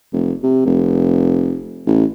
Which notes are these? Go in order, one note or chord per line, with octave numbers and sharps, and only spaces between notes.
F1
C3
F1
A1